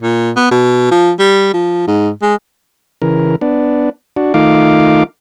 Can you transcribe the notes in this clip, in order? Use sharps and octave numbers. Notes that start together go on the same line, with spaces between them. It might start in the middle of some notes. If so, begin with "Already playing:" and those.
A#2
B3
B2
F3
G3
F3
G#2
G#3
C#3 E3 A#4
B3 D4
D4 F#4
D#3 A3 D#4 F4 F5 D6